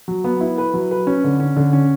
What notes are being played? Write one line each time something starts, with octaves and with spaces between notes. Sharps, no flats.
F#3
B3
E4
B4
F#3
B4
C#4
D3
C#4
D3
C#4